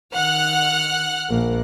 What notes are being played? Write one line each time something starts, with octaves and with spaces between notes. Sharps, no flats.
D#3 F#5 F6 F#6
A#1 A#3